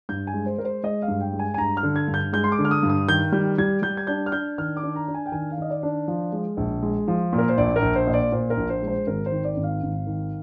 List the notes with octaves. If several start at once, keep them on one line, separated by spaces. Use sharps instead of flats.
G2 G6
G#5
G#3
C5
G#3 A#4
C5
G#3 D#5
F5
G2
G5
G#3
G#5
G#5
G2 A#5
F6
D3
G#6
G2
G6
G#3 G6
C6
D6
D3
F6
D#6
G2
D#6
D#3 G6
G3 G6
G3 G#6
G3 G6
G#6
D4 G6
F6
D4 G6
D#3 F6
D6
D4
A#5
D4
G#5
G5
D#3 G#5
F5
D#3 D#5
D5
D4
F3
G#3
A#1
G#3
F3
A#2
A#4
C5
A#1 D5
A#4
A#1
C5
A#2 D#5
D5
A#2 C5
A#4
A#1
C5
G#3
C5
G#1 A#4
C5
D#3
D5
G#1
F5
G#1
D#3